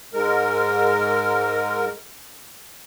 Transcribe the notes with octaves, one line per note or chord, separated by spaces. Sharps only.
G#2 G#3 A#4